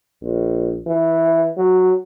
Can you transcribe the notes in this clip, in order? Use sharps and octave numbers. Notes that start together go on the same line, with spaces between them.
A#1
E3
F#3